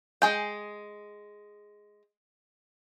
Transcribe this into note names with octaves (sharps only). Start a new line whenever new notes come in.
G#3 G#4 G5